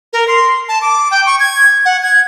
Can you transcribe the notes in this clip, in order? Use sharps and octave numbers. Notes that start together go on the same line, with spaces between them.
A#4
C6
A5
D6
G5
C#6
G#6
F#5
G#6